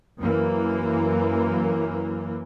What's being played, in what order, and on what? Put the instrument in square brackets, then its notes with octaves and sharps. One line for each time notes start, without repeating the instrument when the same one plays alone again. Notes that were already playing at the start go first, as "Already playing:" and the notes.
[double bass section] F#2 E3 A#3